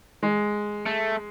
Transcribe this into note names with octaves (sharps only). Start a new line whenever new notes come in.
G#3
A3